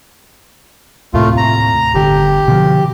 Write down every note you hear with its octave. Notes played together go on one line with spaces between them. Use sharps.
D#2 A2 C3 A3 F4
A#5
G1 D3 G4
B2 D3 F3